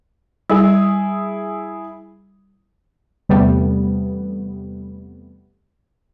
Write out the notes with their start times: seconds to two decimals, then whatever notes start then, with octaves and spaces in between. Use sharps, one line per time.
0.50 G3 E4 G#4
3.29 E2 C3 G3 A3 B3